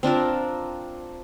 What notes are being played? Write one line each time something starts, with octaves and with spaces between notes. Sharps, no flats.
C4 D4 F4 A#4